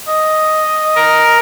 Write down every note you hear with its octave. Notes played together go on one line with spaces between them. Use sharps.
D#5
A#4